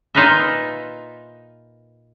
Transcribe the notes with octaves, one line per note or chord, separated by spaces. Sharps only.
A#2 D#4 F4 B4 D#5 E5